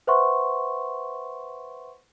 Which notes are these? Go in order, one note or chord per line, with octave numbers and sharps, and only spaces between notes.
B4 C5 E5 F#5 C6 C#6